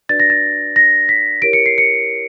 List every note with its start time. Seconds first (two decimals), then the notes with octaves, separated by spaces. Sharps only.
0.09 D4 F#4 B4 D5 A6
0.20 A#6
0.30 A6
0.76 A#6
1.09 B6
1.42 E4 G4 A#4 C#5 D7
1.53 C#7
1.66 C7
1.78 C#7